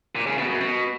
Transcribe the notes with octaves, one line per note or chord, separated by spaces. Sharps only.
A#2
C#3
B2
F#2
B2